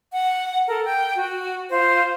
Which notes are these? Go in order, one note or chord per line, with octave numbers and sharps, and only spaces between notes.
F#5
A4 A#4
G5
F#4
F4 C5